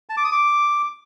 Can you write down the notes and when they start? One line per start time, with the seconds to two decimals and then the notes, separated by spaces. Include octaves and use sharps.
0.09 A5
0.17 D6
0.24 D#6
0.32 D6